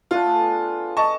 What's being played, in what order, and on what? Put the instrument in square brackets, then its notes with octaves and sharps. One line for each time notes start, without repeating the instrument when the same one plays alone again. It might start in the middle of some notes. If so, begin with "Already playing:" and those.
[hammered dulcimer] A3 D4 F#5 [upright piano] F4
[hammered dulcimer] G#4 A4
B3
[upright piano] D#5 A5 C#6